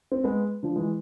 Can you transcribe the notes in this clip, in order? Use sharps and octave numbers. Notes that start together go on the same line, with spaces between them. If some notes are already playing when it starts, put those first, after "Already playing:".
C4
G#3 B3
D3 F3
E3 G#3